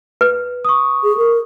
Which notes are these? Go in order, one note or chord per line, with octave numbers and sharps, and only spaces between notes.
B4
C#6 D#6
G#4
A#4